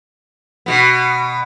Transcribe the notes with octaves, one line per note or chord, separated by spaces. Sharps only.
B2 B3